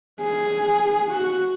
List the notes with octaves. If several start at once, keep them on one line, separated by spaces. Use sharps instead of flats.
G#4
F#4